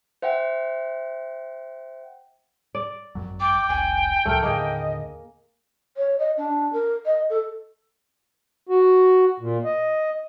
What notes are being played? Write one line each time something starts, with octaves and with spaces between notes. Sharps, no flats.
C5 E5 F#5 G5
D5
G#1 F#2 F#3
G5 D6
F1 C2 G#5
C#2 A#2 F3 A3 A#4
D#2 A2 D3 A#3 G#4 D#5
C#5
D#5
D4
A#4
D#5
A4
F#4
A#2
D#5